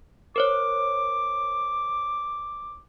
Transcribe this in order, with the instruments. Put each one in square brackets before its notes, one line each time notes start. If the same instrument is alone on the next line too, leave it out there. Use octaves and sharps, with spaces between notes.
[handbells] A#4 C5 C#5 [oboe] D6